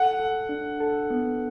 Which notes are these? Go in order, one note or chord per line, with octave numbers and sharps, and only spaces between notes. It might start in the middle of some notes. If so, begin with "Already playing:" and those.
Already playing: A4 F#5
A4
D4
A4
B3